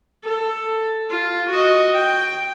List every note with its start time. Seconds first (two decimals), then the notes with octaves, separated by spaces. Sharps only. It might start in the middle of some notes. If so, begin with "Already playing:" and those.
0.24 A4
1.10 F4
1.50 F#4 D#5
1.95 G5